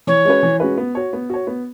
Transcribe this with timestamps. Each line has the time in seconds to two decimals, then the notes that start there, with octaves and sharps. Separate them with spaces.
0.07 E3 C#5
0.25 G#3 C#4 F#4 B4
0.43 E3
0.60 G#3 C#4 F#4 B4
0.78 B3
0.95 F#4 C#5
1.13 B3
1.30 F#4 C#5
1.47 B3